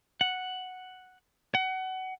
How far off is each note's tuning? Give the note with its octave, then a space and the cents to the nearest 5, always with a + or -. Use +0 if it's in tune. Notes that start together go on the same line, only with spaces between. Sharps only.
F#5 +0
F#5 +25